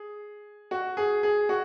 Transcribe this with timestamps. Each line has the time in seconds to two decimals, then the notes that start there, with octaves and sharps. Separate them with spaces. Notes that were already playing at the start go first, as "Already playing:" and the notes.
Already playing: G#4
0.71 F#4
0.97 G#4
1.23 G#4
1.49 F#4